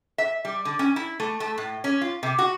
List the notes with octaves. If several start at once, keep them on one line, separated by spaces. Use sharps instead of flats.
E5
G3
D3
C#4
E4
A3
A3
A2
C#4
F4
C3
F#4